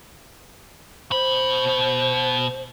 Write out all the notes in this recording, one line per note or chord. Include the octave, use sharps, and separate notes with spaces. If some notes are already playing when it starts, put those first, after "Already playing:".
B2 C5 B5